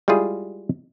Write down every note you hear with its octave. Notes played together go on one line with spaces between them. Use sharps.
G3 G#3 E4 F4 G#4